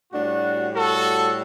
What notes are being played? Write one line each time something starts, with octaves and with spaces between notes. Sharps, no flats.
A2 G3 D4 F#4
F#4 A4